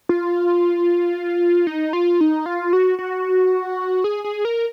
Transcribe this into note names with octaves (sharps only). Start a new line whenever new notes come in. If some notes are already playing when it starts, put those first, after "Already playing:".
F4
D#4
F4
D#4
F4
F#4
F#4
G#4
G#4
A#4